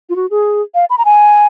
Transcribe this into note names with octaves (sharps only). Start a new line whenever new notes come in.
F4
F#4
G#4
F5
B5
A#5
G#5